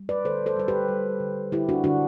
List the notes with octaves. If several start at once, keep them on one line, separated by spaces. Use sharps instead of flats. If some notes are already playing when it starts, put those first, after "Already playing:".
Already playing: G3
B4 D5
D3 A4 C5
A4 C5
G3 C5
G4 B4
G3
D3
D3 E4 G4
D4 F#4
D3 D4 F#4